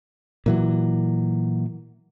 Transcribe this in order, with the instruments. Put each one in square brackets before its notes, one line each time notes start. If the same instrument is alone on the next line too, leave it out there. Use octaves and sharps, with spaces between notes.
[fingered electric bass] A#2 E3 F#3